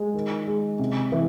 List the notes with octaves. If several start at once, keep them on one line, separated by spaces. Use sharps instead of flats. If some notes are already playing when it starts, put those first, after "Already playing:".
Already playing: G#3
D#3
G#3
C3
E3